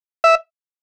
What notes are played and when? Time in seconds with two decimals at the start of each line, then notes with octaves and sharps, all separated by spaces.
0.24 E5